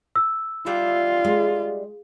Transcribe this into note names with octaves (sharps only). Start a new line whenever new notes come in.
E6
G3 D4 F4 E5
G#3